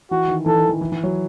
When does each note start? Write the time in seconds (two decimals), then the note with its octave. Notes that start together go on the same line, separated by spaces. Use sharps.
0.11 E3 F#4
0.28 D#3
0.46 E3 A4
0.58 D#3
0.69 E3
0.81 E3
0.92 E3
1.03 F#3